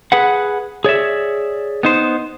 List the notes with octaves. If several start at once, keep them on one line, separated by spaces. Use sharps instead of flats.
G#4 B4 F#5
G#4 C#5 D5 E5
B3 D#4 C5